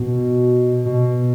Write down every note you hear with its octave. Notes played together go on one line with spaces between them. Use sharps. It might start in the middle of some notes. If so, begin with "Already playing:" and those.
Already playing: B2
B2